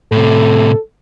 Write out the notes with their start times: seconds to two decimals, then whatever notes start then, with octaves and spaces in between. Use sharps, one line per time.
0.12 A2 C3 A4